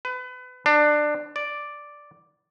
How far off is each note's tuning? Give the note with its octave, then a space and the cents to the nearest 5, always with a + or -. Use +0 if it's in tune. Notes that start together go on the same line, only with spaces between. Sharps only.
B4 +30
D4 +20
D5 +0